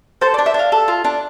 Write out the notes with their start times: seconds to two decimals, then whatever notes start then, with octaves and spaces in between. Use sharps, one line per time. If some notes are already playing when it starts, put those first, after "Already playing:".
0.21 A4 C5
0.34 D5
0.38 D4
0.46 E5
0.54 D4 F5
0.72 A4
0.88 F4
1.04 D4